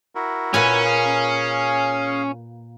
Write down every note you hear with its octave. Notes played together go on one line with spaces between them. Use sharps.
E4 F#4 A#4
A#2 C#4 B4 G#5
G#4 F5